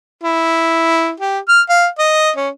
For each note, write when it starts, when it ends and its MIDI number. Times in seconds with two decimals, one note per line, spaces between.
0.24 1.12 64
1.20 1.39 67
1.49 1.62 89
1.69 1.87 77
1.99 2.31 75
2.36 2.49 61